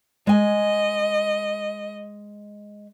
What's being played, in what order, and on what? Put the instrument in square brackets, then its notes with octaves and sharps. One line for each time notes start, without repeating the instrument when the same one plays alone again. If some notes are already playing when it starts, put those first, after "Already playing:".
[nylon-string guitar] G#3 G#5 [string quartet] D#5